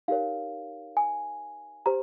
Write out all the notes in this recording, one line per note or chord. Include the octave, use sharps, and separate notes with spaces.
D#4 G4 A#4 C#5 F5
G#5
G4 C5 A#5